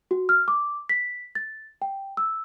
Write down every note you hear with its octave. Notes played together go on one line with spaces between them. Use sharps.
F#4
F6
D6
B6
A6
G5
E6